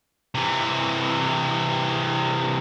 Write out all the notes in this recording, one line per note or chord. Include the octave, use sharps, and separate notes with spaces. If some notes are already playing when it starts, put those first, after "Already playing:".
C3 E3